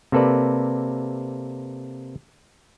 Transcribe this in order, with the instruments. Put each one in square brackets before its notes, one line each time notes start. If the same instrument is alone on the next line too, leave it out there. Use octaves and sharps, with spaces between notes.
[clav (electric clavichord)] C3 A#3 A4 B4 D5